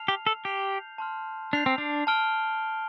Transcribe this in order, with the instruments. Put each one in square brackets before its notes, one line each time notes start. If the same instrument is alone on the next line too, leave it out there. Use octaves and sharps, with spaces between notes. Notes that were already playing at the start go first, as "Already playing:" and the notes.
Already playing: [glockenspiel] A5 F6 C7 F7
[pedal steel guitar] G4
A4
[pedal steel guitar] G4 [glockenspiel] G6 C7 F7
[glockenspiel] A5 C6 F6
[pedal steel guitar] D4 [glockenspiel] G6 C7 F7
[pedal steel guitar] C4
D4
[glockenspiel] A5 F6 D7 G7